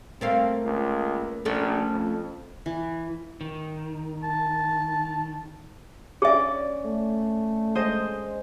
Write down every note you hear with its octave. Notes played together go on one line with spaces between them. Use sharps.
A3 A#3 C4 F5
C#2
A#1 A3 C#4 A4
F2
E3
D#3
A5
C#4 G#4 D5 E5
A3
G#3 C5 D#5